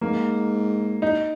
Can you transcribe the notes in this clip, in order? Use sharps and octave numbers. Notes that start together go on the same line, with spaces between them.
G#2 A#3
D#4